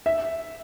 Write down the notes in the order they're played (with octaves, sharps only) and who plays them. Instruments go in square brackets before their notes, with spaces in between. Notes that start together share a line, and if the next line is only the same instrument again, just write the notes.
[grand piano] E5